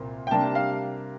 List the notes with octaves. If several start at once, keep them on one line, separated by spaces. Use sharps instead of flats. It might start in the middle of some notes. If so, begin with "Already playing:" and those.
Already playing: C2 A#2 C4
G5
C3 G3 A#3 D4 A5
F5